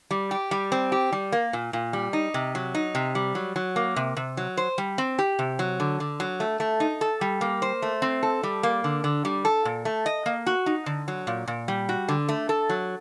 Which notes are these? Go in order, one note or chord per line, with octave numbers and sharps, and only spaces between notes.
G3
G4
G3
C4
G4
G3
A#3
A#2
A#2
G3
D#4
C3
F#3
D#4
C3
G3
F#3
F#3
A#3
C3
C3
F#3
C5
G3
C4
G4
C3
F#3
D3
D3
F#3
A3
A3
D#4
A4
G3
A#3
C5
A3
C4
A4
G3
A#3
D3
D3
G3
A4
A#2
A3
D#5
A#3
F#4
D#4
D3
F#3
A#2
A#2
G3
F#4
D3
A3
A4
F#3